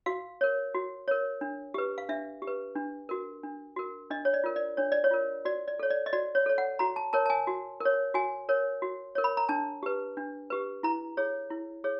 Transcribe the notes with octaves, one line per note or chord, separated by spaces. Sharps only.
F#4 F5
A#4 C#5
F#4
A#4 C#5
D4
G4 B4
F5
D4 E5
G4
B4
D4
F#4 A#4
D4
F#4 A#4
D4 D#5
C#5
D5
F4 A#4
D5
D4 C#5
D5
C#5
F4 A#4
F#4 D5
D5
A4 C#5
D5
D#5
F#4 D5
C#5
A4 C#5
F#5
F#4 A#5
A5
A#4 C#5 A5
A5
G#5
F#4
A#4 C#5
F#4 G#5
A#4 C#5
F#4
A#4 C#5
B5
A#5
D4 A5
G4 B4
D4
G4 B4
E4 A#5
G#4 C#5
E4
G#4 C#5